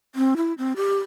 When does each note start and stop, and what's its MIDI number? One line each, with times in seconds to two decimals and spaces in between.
0.15 0.34 60
0.37 0.53 64
0.58 0.73 60
0.76 0.99 67